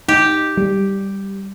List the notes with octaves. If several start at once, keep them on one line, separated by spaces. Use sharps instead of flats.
D#4 G4
G3